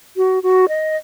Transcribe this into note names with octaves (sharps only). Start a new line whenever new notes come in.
F#4
F#4
D#5